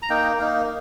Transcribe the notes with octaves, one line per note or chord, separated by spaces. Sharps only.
A#5
A#3 D#4 G5
A#3 D#4